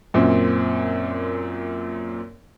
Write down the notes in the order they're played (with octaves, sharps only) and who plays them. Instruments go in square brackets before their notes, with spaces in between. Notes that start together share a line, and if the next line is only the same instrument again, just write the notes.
[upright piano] F#2 A#2 C4